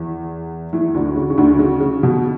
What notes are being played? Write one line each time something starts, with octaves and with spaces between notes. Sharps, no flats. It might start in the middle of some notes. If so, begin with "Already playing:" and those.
Already playing: E2 E3
E2 E3
D2 D3
C#3
C#3
D2 D3
C#3
C#3
B2